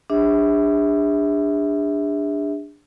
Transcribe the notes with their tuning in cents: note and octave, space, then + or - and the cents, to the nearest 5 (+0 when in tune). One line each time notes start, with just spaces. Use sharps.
D4 +0 G#4 -40 E5 -25